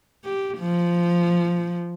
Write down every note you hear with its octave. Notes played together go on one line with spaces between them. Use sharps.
G4
F3